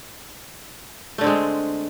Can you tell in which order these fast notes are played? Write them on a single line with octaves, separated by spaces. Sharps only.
A3 D3 C4 G#3